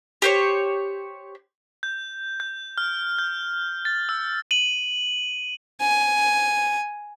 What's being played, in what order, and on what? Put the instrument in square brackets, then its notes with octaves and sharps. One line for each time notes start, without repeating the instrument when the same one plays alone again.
[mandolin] G4 C5 C#5
[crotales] G6
G6
F6
G6
A6
E6
D#7 F#7
[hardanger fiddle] G#5